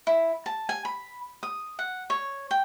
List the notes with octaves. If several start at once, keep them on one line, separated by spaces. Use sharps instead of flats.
E4
A5
G#5
B5
D#6
F#5
C#5
G5